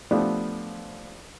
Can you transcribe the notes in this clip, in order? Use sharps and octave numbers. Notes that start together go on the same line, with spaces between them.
F3 A3 B3 D4 G4